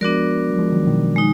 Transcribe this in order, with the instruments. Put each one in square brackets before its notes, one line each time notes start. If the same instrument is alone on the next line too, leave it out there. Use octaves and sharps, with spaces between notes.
[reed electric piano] F3 G#3 [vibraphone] B3 D4 F#4 A#4 D5
[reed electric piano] F#3
F3 G#3
D#3 F#3
B2 D#3
[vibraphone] G#3 D#4